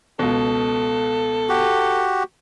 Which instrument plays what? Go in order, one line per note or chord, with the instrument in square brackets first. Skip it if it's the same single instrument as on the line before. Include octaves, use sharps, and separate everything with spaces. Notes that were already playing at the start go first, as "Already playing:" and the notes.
[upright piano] C#2 B2 [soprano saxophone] A4
[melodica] F#4 G4